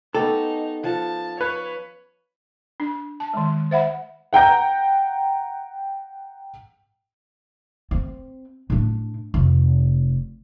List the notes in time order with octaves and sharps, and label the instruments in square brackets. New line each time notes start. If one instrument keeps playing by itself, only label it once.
[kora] B3 C#4 G4 [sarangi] D#4 [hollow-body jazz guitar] A4
[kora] F3 F#5 [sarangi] A5
[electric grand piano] B4 [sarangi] C#5
[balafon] D4
A5
D#3 G#3
C5 E5 F#5 B5
[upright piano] F#5 G5 A#5 G6
[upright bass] C4
A2 D4
F1